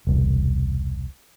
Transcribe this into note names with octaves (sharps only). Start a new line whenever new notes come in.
E1 C2